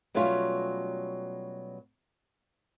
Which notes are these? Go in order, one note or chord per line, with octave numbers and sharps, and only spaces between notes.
B2 F#3 G3 A3 C#4 F4